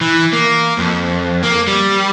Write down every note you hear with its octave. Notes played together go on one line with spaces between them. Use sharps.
E3
A#3
F2
A#3
G3